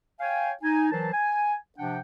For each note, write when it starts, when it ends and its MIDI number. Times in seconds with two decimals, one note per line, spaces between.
0.20 0.51 73
0.20 0.51 77
0.20 0.51 79
0.20 0.51 80
0.62 0.90 63
0.62 0.90 80
0.91 1.11 52
0.91 1.11 54
0.91 1.11 70
0.91 1.11 72
0.91 1.11 81
1.12 1.54 80
1.78 1.98 48
1.78 1.98 53
1.78 1.98 62
1.78 1.98 78
1.78 1.98 79